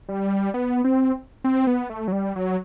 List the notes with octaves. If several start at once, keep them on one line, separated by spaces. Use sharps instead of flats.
G3
B3
C4
C4
B3
A3
F#3
G3
F#3